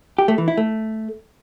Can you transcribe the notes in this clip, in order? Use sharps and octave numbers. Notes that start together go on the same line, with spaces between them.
G4
A3
E3
E4
A3